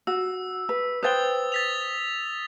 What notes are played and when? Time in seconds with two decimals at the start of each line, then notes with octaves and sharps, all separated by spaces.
0.07 F#4 E6
0.69 B4
1.03 B4 C5 G5 D#6 A6 G7
1.52 A6 B6 F7